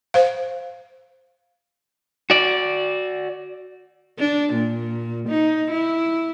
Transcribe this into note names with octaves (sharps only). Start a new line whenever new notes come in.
C5 F5
F#4 D5
D4
A#2
D#4
E4